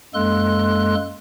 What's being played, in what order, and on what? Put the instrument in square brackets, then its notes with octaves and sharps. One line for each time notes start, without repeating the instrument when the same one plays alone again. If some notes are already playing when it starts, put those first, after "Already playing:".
[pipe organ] F#2 G#3 A#3 A4 C6 F#6